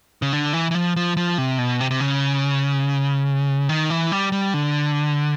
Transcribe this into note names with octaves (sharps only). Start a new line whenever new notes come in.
C#3
D3
E3
E3
F3
F3
F3
C3
B2
C3
C3
C#3
D#3
E3
G3
G3
D3